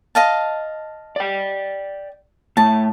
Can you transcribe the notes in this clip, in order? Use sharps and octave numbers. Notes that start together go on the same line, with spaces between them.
D#5 F5 A5
D5 G5
A2 A3 A5